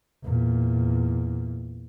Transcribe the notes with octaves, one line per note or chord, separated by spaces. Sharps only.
E2 A#2